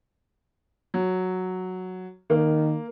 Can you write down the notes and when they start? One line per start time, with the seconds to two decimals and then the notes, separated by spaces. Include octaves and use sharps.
0.94 F#3
2.30 D#3 A#3